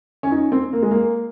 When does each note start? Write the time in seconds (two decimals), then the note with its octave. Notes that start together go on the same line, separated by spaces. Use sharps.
0.23 C#4
0.31 D#4
0.52 C4
0.73 A#3
0.82 G#3
0.91 A#3